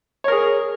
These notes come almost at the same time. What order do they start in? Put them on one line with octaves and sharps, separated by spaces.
C#5 A#4 G#4